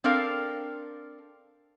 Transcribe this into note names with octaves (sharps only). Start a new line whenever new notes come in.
C4 D4 A4 A#4 F5